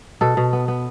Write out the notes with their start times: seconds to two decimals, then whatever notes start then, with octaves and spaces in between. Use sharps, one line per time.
0.21 B2 A4
0.37 B2
0.53 B3
0.68 B3